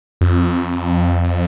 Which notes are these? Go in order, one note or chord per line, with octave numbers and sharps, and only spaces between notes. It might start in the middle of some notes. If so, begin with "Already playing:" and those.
F2